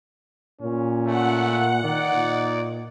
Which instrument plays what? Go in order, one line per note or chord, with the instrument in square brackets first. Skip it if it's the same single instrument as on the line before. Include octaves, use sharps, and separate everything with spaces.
[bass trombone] A#2 [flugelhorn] C#4
[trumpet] A3 [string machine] F#5
[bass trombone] D#3 [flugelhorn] D#4 [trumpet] D5
[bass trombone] A#2